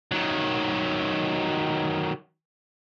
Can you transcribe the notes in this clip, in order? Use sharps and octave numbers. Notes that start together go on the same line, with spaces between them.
D#3 F#3